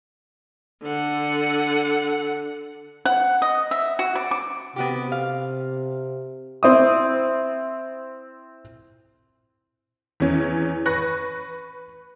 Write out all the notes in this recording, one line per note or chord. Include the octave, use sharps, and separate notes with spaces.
D3 F#5
F#5
D#5
E5
F#4
D5
D6
C3 B3 F#4 G4
F5
C4 E4 D#6
E2 C#4
B4 C#6 F#6 A#6